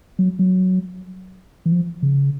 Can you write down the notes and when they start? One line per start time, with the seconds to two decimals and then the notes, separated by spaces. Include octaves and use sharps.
0.19 F#3
0.39 F#3
1.66 E3
1.72 F3
2.03 C#3